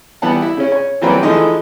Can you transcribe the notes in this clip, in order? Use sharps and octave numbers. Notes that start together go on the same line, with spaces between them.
E3 G3 B3 F#5 A5
E4
C#3 C#4
C#5
E3 F#3 G3 A#3 C4 B4
E3 F3 G#3 A3 D#4 E4